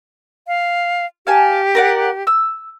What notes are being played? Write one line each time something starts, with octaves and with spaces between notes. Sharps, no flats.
F5
G4 F5 G#5 A5
A#4 D5 F#5
E6